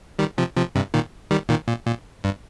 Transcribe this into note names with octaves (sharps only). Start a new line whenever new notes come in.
D#3 G3
C3 F3
C3 F3
G2 C3
A#2 D#3
D#3 G3
A#2 D#3
A#2
A#2
G2